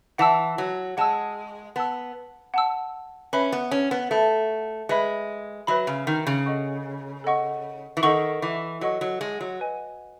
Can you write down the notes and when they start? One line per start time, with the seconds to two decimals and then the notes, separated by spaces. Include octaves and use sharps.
0.18 E3 F#5 A5 E6
0.58 F#3
0.97 G#3 F#5 A5 E6
1.76 B3 F#5 A5 E6
2.54 F#5 A5 E6
3.33 C#4 B4 E5 B5
3.52 B3
3.71 C#4
3.91 B3
4.11 A3 B4 E5 B5
4.89 G#3 B4 E5 B5
5.67 F#3 B4 E5 B5
5.87 C#3
6.07 D#3
6.27 C#3
6.46 A4 D#5 F#5 C#6
7.24 A4 D#5 F#5 C#6
7.97 E3
8.03 D#3 A4 D#5 F#5 C#6
8.42 E3
8.81 F#3 A4 D#5 F#5 C#6
9.01 F#3
9.21 G#3
9.41 F#3
9.60 B4 D#5 G#5